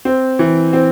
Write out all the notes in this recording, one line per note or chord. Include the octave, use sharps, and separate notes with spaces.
C4
E3
C4